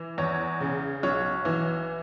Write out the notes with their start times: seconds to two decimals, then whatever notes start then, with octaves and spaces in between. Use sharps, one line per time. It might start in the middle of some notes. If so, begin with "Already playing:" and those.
Already playing: E3
0.18 E2 C#5
0.61 C#3
1.03 B1 C#5
1.45 E3